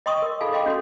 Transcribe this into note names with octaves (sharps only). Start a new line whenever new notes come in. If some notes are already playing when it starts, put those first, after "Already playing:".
D#5 G5 C6 C#6 D#6
A#4 D#5
D#4 F4 G#4 A4 F5 G#5
D#5 F5 G5 C6 D6
C#4 F#4 A4 C6